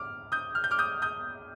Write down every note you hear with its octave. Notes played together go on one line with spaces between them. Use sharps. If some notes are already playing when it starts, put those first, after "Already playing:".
Already playing: D6 F6
D#6 G6
F6
G6
D6 F6
D#6 G6
D#6 G6